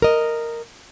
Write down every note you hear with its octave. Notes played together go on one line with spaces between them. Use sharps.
A#4 D#5